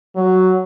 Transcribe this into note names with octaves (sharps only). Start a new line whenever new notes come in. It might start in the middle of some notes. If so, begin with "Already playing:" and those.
F#3